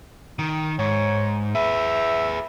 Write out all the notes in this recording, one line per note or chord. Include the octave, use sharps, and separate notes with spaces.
D#3
G#2 C#5
G#4 B4 E5